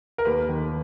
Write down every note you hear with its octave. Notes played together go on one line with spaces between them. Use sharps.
A#4
D#2 B4
D#3